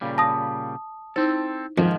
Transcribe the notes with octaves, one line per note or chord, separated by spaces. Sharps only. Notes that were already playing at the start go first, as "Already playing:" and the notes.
A#2 C#3 G3
A5 D#6 A#6
C4 D#4 E4 A4 C5
F2 G#2 D#3 F3